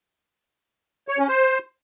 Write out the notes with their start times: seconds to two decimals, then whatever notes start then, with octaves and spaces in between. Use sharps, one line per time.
1.08 C#5
1.18 C#4
1.28 C5